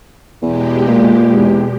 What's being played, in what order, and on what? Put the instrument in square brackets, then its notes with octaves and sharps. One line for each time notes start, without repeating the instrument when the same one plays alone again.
[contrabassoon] E2 [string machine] B2 G#3 G4
[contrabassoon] A#2
E2